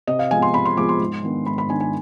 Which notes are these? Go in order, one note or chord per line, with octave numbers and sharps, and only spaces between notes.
C3 D#5
F5
F3 G#3 B3 G#5
C6
C3 B5
C6
F3 G#3 B3 D6
C6
G#2
D#3 B3 D4
G#2 B5
B5
D#3 B3 D4 G#5
G#5